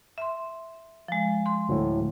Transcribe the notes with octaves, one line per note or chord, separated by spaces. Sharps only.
E5 C6
F3 G#3
C6
D2 A2